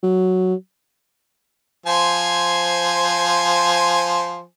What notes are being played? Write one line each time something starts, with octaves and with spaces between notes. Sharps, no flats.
F#3
F3 C5 G#5